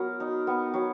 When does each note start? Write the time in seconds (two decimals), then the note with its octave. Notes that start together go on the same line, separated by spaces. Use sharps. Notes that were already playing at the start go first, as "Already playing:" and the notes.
Already playing: F#3 B3 A#4
0.20 D#4
0.47 B3
0.74 F#3